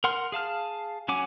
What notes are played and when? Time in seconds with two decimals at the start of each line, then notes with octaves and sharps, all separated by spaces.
0.04 A#4 F#5 C6 F6
0.32 G#4 F5 A5 F6
1.08 F#3 C#4 F#5 G#5 D6